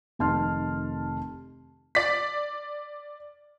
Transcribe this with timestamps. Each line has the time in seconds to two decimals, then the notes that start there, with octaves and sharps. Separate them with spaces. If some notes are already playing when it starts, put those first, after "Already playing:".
0.19 F1 D#3 A5 C6 F6
1.95 D5 B6